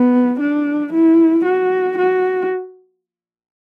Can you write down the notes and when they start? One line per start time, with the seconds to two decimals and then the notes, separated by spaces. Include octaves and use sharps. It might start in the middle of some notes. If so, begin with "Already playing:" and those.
Already playing: B3
0.40 D4
0.93 E4
1.46 F#4
1.98 F#4